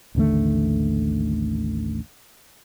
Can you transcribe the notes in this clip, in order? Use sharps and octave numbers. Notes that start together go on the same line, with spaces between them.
A1 D#2 D3 A3